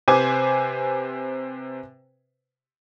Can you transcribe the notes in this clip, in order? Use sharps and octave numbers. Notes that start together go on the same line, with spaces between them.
C3 B4 C5 G#5 D6